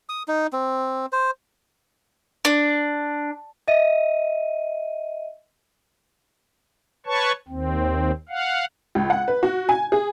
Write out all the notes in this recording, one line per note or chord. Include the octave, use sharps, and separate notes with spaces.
D#6
D#4
C4
C5
D4
D#5 E5 D#7
B4 C#5 A5 C#6
D#2 C4
F5 F#5
C#2
F#5
B4
F#4
G#5
G#4